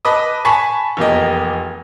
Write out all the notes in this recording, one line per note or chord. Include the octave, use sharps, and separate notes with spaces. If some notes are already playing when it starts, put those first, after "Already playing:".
B4 D#5 A5 B5 D6 D#6
G#5 A5 B5 C#6 B6
F1 E2 A#3 G4 D#5